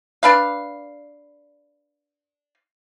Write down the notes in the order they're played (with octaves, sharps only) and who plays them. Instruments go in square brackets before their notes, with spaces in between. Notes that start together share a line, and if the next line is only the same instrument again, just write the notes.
[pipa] D4 B4 F5